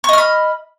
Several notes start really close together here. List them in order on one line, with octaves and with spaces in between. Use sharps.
C#6 D#5 F6 B5